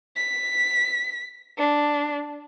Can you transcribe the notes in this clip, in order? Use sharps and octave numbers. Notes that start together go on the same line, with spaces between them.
B6
D4